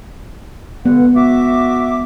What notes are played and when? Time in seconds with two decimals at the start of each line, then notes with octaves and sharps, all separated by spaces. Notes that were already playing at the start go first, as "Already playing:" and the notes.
0.86 G2 D3 G#3 B3 F#5
1.16 F#4 E5 D6